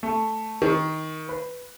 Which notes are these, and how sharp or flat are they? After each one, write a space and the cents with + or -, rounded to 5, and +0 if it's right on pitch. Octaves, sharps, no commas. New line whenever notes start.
A3 +0
D#3 +15
B4 +0